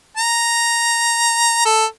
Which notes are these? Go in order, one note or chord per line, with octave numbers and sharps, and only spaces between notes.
A#5
A4